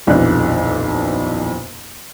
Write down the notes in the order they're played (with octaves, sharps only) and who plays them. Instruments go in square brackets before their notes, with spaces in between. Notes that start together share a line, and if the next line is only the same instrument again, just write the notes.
[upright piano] D#1 B1 F2 E3 D4 F#6